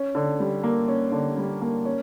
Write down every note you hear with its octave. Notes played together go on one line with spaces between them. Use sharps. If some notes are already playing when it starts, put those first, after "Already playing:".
Already playing: C#4
D3
G3
A#3
C#4
D3
G3
A#3
C#4